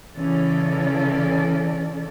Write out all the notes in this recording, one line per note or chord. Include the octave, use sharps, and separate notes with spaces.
C#3 E3 C#4 A4 D5